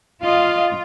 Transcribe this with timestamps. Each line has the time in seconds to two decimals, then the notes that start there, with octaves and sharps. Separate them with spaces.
0.23 F4 D#5 F5